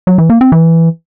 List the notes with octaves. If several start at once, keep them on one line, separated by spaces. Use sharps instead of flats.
F#3
E3
A#3
C4
E3